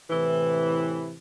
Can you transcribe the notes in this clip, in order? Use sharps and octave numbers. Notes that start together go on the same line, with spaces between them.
A2 C3 E3